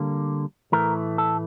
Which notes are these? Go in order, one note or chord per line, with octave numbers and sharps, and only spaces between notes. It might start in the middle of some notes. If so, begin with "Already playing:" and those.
Already playing: D3 G3 A#3
A2 E3 A3 A#4
A4